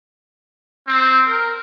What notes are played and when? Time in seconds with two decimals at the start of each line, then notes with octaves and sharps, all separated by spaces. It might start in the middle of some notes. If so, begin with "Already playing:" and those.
0.88 C4
1.26 A#4